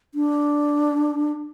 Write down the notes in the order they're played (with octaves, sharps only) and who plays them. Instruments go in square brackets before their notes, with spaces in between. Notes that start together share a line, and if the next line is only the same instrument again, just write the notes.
[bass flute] D4